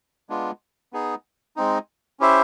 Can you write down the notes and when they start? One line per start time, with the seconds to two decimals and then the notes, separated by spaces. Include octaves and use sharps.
0.29 G#3 B3 D4 F4
0.93 B3 D#4 G#4
1.56 G#3 C4 D#4
2.20 C#4 E4 G4 C5 E5